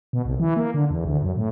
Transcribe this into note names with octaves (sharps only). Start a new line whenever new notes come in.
B2
C2
E3
A#3
D3
E2
D2
F#2
A2